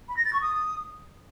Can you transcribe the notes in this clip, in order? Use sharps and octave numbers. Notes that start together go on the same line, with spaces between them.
B5
A#6
A6
C#6
D#6